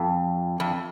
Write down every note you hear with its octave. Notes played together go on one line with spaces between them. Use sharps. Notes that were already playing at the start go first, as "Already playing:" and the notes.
Already playing: F2
F2